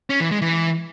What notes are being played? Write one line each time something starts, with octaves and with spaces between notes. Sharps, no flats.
C#4
E3
G#3
E3